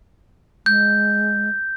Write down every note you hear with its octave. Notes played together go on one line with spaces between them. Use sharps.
G#3 G6